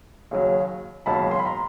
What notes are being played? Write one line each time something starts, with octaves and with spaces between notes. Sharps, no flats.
D#2 C#3 F#3
E1 D#2 C#3 F#3 A5 B5
C6
B5
A#5 C6